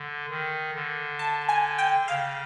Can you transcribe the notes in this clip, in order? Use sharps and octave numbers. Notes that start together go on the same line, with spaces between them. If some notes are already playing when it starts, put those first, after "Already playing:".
Already playing: D3
D#3
D3
A5
G#5
G5
C#3 F5